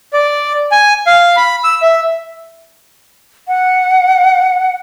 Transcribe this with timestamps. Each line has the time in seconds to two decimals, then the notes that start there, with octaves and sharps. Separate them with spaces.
0.13 D5
0.72 G#5
1.07 F5
1.37 B5
1.64 E6
1.82 E5
3.48 F#5